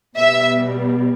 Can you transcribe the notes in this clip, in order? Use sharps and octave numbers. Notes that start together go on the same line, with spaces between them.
B2 G3 B3 E5